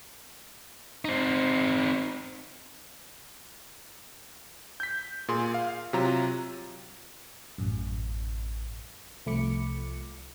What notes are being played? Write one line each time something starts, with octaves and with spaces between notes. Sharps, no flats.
C4 D#4
G6 B6
A#2 G#4 C6
F5
C3 F#3 F4 A#5
A1 F#2
C2 F3 A3 B5 D6 C#7